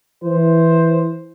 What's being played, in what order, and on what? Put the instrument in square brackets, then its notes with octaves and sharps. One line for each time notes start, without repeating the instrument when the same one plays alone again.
[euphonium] E3 [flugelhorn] C5